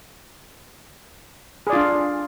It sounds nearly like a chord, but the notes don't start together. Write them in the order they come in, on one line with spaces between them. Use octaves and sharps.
G#4 D5 F4 D4